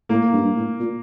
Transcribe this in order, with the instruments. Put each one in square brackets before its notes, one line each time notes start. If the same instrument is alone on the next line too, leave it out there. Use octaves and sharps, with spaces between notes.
[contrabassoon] A2 [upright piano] A#3
[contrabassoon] G2
A2
A#2